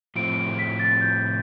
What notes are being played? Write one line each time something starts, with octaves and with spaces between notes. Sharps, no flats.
A2 F3 C4 D7
B6
A6
G6